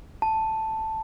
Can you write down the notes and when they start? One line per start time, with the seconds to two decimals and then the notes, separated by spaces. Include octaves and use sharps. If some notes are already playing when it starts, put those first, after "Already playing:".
0.22 A5